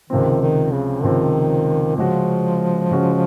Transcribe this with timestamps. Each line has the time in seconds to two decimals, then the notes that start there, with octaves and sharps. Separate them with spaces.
0.10 C#2 C3 D#3 F3 C4
0.41 D#3
0.72 C#3
1.03 C#2 C3 D#3 F3 C4
1.96 C#3 F3 G#3 C#4 F#4
2.90 C#3 G#3 C#4 F#4